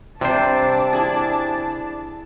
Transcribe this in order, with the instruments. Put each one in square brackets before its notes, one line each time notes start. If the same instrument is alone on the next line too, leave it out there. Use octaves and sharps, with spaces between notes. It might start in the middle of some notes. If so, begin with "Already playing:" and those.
[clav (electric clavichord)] C3 C5 [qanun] G3 C4 [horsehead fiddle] D4 [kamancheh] A5
[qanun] E4 G#4